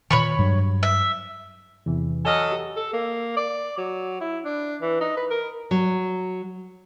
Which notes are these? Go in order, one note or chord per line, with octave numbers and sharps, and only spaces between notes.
A#2 D#3 C#5 B5 C#6
G2 F#3
E5
E2 C3 E3
F#3 A4 D#5 G#5 E6 F6
G4
A4
A#3
D5
F#3
E4
D4
E3
D#4
B4
A#4
F#3